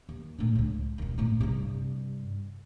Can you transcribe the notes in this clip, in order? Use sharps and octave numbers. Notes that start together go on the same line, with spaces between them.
D#2
A2 D4
C#2 C#3
D#1 D#3
A2 E4
G2 C3